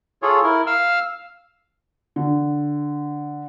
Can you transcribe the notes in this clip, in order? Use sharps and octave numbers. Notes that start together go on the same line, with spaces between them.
F4 G#4 A4 C#5
E4 A#4
F5 E6 F6
D3